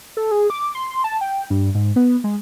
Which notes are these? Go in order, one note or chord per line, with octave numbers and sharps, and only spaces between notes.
A4
G#4
D6
C6
A5
G5
G2
G#2
B3
G#3